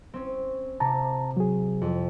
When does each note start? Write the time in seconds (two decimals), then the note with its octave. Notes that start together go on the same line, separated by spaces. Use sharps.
0.14 C4 C#4
0.80 C3 A5 A#5
1.37 F#3 G#4
1.82 F2